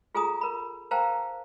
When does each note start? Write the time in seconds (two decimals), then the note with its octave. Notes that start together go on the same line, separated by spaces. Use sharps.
0.15 F4 G#4 A4 G#5 A#5 D#6
0.41 A#4 B5
0.91 A#4 C5 F5 G5 A5 A#5